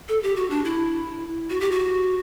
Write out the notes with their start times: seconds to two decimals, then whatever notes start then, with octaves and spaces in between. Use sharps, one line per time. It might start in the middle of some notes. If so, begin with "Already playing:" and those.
0.08 A4
0.23 G4
0.36 F#4
0.50 D4
0.65 E4
1.50 F#4
1.61 G4
1.71 F#4